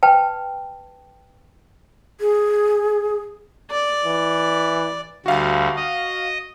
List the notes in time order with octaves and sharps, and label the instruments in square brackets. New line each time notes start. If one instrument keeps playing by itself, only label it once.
[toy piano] B4 G5 A5
[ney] G#4
[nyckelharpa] D5
[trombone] E3
[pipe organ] D2 G3 [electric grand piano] F#4 F5
[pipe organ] D#5